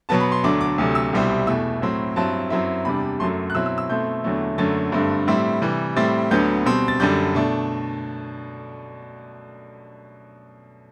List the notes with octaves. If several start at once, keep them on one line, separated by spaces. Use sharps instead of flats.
B2 F#3 B3 A5
B5
C6
D2 D3 F#3 A3 D4 D6
D6
D2 C3 F#3 A3
E6
C2 B2 G3 C4 E4
E2 B2 A3 E4 E6
A2 F#3 C4 E4
G2 F#3 C4 E4 A5
F#2 F#3 C4 E4
E2 C3 G3 D4 B5
F#2 F#3 A3 C6
F#6
B2 F#3 C4 E4 E6
E6
E6
B2 A3 C4 E4 G6
E2 D3 F#3 A3 E4
F#2 D3 F#3 A3 A6
G2 D3 A3 C4
A2 G3 C4 E4
C3 E3 G3
A2 G3 C4 E4 A6
D2 D3 F#3 B3 G6
B2 G3 C4
A6
F#2 D3 G3 D4 G6
B2 A3 D4